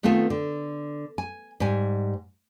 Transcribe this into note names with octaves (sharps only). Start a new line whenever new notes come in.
D#3 A3 B3 C4 F4 A4
D3
G#5
G#2 G3 G#5